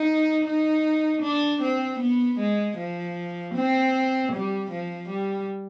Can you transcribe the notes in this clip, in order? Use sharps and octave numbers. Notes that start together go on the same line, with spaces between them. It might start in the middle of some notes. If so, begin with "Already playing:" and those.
Already playing: D#4
D#4
D4
C4
B3
G#3
F3
C4
G3
F3
G3